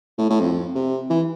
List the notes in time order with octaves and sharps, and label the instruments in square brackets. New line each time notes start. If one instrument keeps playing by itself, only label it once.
[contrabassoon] A2
A2
F2
C3
E3